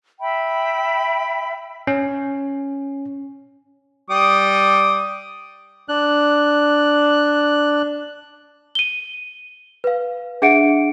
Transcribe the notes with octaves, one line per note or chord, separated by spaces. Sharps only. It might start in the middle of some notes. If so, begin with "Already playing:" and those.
E5 G5 B5
C#4
G3 D6 D#6
D4 F#6
D#7 G7
B4 F5
D4 G#4 E5 F#5 C#7 D7